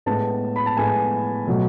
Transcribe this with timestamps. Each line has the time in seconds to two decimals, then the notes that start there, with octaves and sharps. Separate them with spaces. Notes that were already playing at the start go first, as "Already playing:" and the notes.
0.06 A2 G#3 B3 A5
0.56 B5
0.66 A5
0.77 A2 G#3 B3 G#5
1.47 B2 F#3 A3